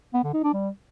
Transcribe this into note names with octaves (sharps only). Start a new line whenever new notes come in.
B3
D3
D#4
D4
G3